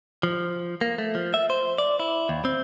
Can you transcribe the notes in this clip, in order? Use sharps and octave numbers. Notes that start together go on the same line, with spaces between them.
F3
A#3
A3
F3
E5
C5
D5
E4
D#2
C4